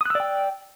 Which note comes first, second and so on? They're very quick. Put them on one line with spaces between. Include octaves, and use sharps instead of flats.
D#6 F#6 E6 D5 G5